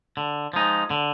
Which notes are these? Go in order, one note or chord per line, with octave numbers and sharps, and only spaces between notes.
D3
F3 G#3 D#4
D3